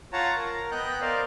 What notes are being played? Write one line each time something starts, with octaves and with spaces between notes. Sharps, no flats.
F4 C#5 F#5 A5 A#5
A#4 A#5
B3 D#5 G5 F#6 G6
A#4 C5 D5 F5